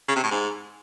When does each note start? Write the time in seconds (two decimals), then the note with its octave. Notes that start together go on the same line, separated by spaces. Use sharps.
0.08 C#3
0.16 C3
0.23 A2
0.31 G#2